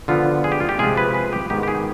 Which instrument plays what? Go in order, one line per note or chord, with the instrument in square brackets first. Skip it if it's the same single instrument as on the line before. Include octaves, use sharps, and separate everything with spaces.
[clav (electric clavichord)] D3 F3 B3 F4
G#4
G4
F4
G4
C3 F3 G#3 C4 F4 G#4
B4
B4
G4
G#2 D#3 B3 G4
G4
G#4